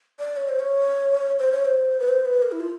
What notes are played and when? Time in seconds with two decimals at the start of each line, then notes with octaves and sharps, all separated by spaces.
0.19 D5
0.37 C#5
0.49 C5
0.60 C#5
1.39 C5
1.52 C#5
1.65 C5
2.00 B4
2.09 C5
2.25 B4
2.42 A#4
2.52 E4
2.60 F4